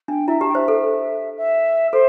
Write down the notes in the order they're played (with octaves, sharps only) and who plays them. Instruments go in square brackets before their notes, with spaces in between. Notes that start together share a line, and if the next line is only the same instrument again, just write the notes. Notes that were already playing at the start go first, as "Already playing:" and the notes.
[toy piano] D4 [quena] G5
[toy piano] E4 [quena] E5
[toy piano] G4 [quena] A5
[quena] G5
[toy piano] C5 [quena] E5
[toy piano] A4
[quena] E5
[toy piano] A4 [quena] C5